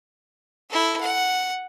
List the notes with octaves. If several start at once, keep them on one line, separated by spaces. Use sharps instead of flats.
E4 A4
F#5